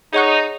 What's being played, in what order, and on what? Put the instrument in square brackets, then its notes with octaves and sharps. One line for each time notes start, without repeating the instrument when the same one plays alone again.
[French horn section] D#4 [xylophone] G#4 C#5 F#5 C#6 F#6